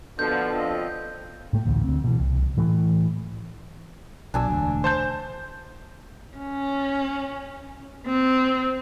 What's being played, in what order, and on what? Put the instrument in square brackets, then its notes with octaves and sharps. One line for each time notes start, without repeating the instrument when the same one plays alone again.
[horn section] B2 D3 F3 [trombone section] B3 D4 A4 [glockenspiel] G6
[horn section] F3 C4 D#5
[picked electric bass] A2 A3
A1 D2
D2 C4
B2 E3
C2
A2 E3 A3
[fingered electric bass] B1 B2 F#3 [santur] D4 G#5 E6
[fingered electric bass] E1 D2
[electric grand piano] C5 A5 G6
[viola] C#4
C4